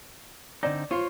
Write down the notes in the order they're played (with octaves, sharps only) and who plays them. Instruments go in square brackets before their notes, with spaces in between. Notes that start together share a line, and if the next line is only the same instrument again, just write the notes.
[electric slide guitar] D3 C4 D#4 [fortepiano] D5
[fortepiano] F4 [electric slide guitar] C5 C#5